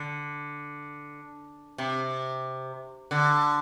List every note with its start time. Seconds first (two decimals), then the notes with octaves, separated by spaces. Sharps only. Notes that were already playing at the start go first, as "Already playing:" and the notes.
Already playing: D3
1.78 C3
3.11 D3